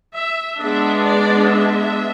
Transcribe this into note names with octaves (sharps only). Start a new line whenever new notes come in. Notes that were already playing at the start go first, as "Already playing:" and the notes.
E5
G#3 B3 D4 E5
D5
E5